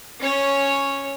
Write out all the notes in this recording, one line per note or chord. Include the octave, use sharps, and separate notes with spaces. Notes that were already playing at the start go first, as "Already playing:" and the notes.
C#4 C#5